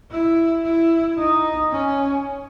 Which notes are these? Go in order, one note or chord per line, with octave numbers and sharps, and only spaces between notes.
E4
E4
D#4
C#4